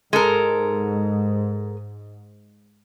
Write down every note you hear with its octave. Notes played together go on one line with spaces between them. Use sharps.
G#2 G#3 A4 A#4